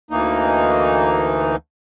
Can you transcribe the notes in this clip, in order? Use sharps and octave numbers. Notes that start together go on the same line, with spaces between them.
D2 E3 A#3 D#4